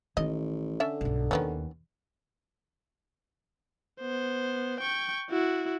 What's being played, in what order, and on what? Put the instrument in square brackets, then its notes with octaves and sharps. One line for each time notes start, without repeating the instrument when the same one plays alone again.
[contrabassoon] A1 [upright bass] D#3 [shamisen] D#5
[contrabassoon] D3 [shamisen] C#4 A4 E5
[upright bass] B1 G2
[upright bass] D#2 [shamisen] D#3 B3 C#4
[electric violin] B3 C5
G5 C#6
E4 F#4